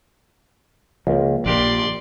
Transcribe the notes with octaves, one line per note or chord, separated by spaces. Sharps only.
C#2 F3 A#3
A#1 D4 G4 A#4 D5 C6